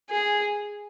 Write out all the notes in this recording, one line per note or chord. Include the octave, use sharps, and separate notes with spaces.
G#4